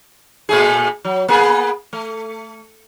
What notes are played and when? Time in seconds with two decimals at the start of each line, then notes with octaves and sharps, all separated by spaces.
0.49 A#2 A3 G#4
1.05 F#3
1.28 A#3 B3 G#4
1.93 A3